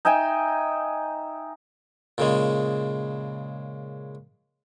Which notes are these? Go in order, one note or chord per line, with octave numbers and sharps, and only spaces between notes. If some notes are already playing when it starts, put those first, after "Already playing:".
D#4 E5 G5 G#5
A#2 C#3 G#3